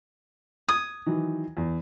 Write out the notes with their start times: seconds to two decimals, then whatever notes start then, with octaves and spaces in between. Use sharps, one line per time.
0.69 D#6 G#6
1.06 D#3 E3 F#3
1.57 E2